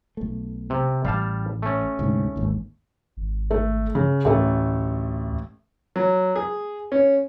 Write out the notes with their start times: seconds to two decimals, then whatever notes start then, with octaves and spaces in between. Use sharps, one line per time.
0.17 B1 A3
0.70 C3
1.05 A1 G3 F5 A5
1.62 A3 C#4
1.99 D2 G#2 C3
2.36 G#1 D#2
3.17 G#1
3.51 A3
3.95 C#3
4.25 A1 D2 A3
5.96 F#3
6.36 G#4
6.92 C#4